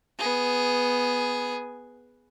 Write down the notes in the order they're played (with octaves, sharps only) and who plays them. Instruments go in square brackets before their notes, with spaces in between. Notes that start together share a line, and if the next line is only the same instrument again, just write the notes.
[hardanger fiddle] B3 G#4